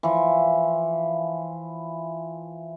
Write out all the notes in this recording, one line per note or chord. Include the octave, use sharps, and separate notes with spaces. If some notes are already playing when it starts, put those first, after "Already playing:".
E3 F3